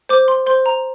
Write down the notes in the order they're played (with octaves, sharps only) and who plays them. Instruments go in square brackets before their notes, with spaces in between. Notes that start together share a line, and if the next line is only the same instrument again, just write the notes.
[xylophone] C5 D6
C6
C5 C6
A#5